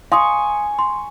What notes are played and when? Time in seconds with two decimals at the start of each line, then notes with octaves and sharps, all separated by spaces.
0.12 F5 G#5 C6 C#6 D#6
0.79 C6